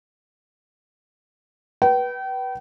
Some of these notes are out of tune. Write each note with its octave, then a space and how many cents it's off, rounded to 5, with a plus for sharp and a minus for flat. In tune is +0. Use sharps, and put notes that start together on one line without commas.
B4 -20 G5 -35